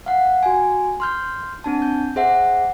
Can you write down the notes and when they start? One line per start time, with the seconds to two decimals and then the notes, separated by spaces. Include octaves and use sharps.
0.06 F5 F#5
0.43 F#4 G#5
1.00 C6 F6 G6
1.64 C4 D4 A5
1.82 G6
2.16 G#4 C5 E5 F#5